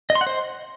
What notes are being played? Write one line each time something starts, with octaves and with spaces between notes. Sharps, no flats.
D#5
C6
F#5
C5